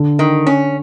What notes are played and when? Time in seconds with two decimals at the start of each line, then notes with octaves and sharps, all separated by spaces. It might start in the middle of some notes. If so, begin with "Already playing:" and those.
Already playing: D3
0.19 D#3
0.47 C#4